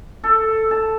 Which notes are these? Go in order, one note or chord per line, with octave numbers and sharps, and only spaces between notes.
A4
A5